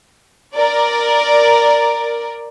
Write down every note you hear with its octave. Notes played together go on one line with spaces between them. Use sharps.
A#4 D5